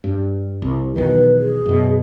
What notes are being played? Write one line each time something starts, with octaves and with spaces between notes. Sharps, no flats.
G2
C2
B1 E2 D#3 B4
G#4
F#2 B2